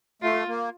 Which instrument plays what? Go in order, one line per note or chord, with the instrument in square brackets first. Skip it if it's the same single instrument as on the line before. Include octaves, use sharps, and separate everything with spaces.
[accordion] A3 [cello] F4
[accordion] A#3